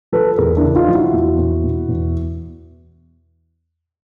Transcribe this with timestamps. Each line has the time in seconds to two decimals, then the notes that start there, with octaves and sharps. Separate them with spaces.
0.12 F3 A4 B4
0.37 E2 G#4 A#4
0.57 D4 E4
0.63 C#3
0.75 D#4 F4
0.88 F3
0.94 E4 F#4
1.13 E2
1.38 E2
1.63 B2
1.89 E2